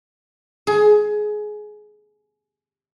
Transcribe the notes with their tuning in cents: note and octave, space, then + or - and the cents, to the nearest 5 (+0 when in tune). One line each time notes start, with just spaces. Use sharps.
G#4 +20